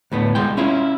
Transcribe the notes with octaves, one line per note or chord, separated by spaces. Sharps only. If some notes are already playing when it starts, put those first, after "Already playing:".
D2 A2 B3
C2 G#3 G5
C#4 E4 F4